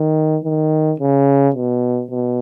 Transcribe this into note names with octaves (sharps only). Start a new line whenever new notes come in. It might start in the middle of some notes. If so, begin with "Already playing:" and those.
Already playing: D#3
D#3
C#3
B2
B2